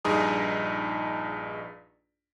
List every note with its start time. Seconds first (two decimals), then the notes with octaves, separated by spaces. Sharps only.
0.05 A#1 G2 D#4 G#4 A#5 D#6